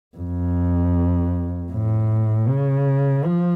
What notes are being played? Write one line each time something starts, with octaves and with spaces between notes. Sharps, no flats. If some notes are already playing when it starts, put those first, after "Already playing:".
F2
A2
C#3
F3